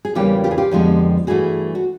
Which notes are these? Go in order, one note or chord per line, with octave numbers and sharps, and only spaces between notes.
G#4
E2 C#3 E3 G3 A#3 F4 G4
F4 G4
G#4
F4 G4
F2 D3 F3 G#3 B3
G2 E3 A3 F#4 G#4
F#4